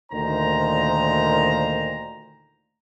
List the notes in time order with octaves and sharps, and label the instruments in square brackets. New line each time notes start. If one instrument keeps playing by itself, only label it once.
[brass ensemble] D2 A#2 D#3 C5 A#5